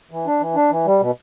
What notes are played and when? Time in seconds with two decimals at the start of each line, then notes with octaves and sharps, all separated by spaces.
0.11 E3
0.27 D4
0.40 E3
0.55 D4
0.71 E3
0.86 G3
1.01 B2